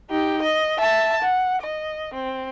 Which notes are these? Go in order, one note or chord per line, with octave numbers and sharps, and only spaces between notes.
D#4 G4
D#5
E5 A5
F#5
D#5
C4